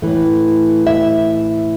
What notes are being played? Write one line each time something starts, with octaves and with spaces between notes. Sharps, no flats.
A2 E3 A3
E5